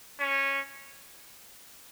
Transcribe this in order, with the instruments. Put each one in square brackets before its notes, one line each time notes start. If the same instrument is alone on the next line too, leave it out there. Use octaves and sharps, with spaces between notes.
[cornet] C#4